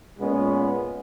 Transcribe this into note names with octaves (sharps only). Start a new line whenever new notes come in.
A#2 G#3 B3 C#4